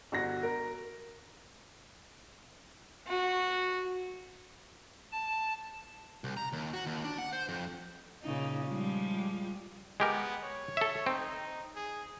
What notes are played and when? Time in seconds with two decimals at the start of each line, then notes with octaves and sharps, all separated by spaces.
0.12 G1 F#4 A#6
0.43 A#4
3.07 F#4
5.12 A5
6.24 C2
6.37 A#5
6.53 D#2
6.73 F#4
6.86 D#2
7.04 D4
7.19 F#5
7.33 C5
7.49 F2
8.22 A#2 C#3 D#4
8.66 F3 G3 G#3
10.00 G#3 B3 G4 A#4
10.43 C#5
10.77 A4 E5
11.06 C4 D#4
11.75 G#4